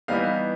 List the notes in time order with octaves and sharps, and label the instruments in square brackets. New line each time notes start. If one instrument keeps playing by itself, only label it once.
[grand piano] E3 G3 B3 D#4 F5